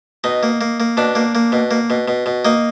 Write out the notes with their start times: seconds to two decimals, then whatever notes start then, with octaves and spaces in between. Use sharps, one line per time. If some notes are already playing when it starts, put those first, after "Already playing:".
0.24 B2 D#4
0.43 A#3
0.61 A#3
0.80 A#3
0.97 B2 D4
1.15 A#3
1.35 A#3
1.52 B2
1.71 A#3
1.90 B2
2.08 B2
2.26 B2
2.45 A#3 D#4